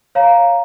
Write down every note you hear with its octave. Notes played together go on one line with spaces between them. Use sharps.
C#5 F5 A#5